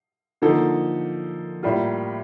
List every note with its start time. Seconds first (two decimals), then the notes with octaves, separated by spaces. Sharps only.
0.42 D3 F3 A#3 D#4 A4
1.63 A2 G3 A#3 F4